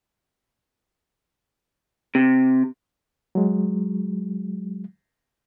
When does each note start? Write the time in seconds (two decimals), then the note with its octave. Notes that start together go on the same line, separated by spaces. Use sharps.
2.15 C3
3.35 F#3 G#3